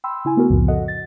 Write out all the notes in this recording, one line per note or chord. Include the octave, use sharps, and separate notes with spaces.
G5 B5 C6 E6
C#3 E4 G#5
A3 B3 F#4 A#4
C2 F2 A2 C#3 F3
F#4 A4 D#5 F#5
A6